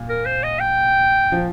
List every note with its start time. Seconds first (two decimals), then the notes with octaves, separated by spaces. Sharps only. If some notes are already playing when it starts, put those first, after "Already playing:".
Already playing: A#2
0.09 A#4
0.26 C5
0.43 D#5
0.60 G5
1.32 F3